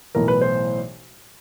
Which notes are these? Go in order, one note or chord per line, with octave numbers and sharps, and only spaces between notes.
B1 A2 E3 A#4
B4
C5